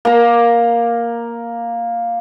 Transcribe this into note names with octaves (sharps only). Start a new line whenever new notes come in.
A#3 A#5